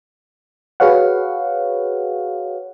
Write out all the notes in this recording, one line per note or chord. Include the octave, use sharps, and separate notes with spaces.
F#4 G#4 B4 C#5 F5 F#5